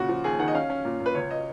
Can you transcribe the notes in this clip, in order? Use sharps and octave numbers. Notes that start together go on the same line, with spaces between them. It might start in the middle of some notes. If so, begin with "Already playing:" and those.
Already playing: A#2 C#3 F#4
F3
D#2 G#4
D#3 F#5
D#5
C#4 F5
C#4
A#2
A#2
B4
C#2 C#5
D#5